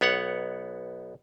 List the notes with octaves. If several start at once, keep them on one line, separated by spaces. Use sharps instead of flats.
B1 B3 C#5 F#5